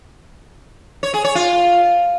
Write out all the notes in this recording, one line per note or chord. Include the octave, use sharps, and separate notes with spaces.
C#5
G#4
C#5
F4